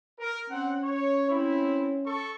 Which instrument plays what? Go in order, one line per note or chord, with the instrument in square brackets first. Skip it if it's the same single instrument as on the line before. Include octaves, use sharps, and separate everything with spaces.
[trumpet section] A#4
[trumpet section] C4 F#5 [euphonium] C#4
[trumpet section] C#5
C4 E4
A4 C#6